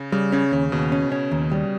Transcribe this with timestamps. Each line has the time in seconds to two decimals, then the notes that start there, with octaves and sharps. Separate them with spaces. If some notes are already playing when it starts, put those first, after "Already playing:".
Already playing: C#3
0.12 C#3 G3
0.32 C#3 C#4
0.52 D#2 C#3
0.72 D#2 B2
0.92 C#4
1.12 C#4
1.31 D#2
1.51 G3